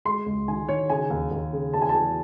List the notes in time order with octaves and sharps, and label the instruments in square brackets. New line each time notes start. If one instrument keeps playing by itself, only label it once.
[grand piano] G#3 [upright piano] C6
[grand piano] C#2
[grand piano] D#3 [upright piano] G#5
[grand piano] D#3 [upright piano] C#5
[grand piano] C#3 [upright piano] G#5
[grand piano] D#2
D#2
C#3
[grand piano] E2 [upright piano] A5
[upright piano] G#5
[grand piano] E2 [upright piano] A5